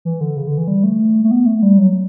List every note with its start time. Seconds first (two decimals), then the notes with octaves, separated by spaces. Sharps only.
0.05 E3
0.21 D3
0.36 C#3
0.47 D3
0.58 E3
0.68 G3
0.84 A3
1.24 A3
1.31 B3
1.46 A3
1.63 G3
1.78 F#3